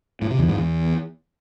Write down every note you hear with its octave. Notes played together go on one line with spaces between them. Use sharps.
A2
C3
E2
G#2
E2